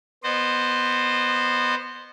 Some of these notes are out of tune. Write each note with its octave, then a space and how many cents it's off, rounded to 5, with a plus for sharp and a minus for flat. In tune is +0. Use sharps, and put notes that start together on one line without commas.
B3 +0 C5 +0 D#5 -30